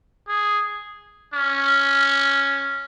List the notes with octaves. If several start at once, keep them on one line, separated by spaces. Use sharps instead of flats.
G#4
C#4